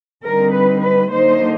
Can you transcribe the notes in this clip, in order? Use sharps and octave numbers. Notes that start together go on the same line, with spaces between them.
D3 G3 C4 D#4 A#4
B4
B4
D3 F#3 A#3 D#4 C5